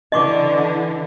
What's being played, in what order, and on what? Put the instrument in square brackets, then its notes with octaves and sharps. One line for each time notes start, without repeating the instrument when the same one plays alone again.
[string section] D3 E3 [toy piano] D#5 C#6 D6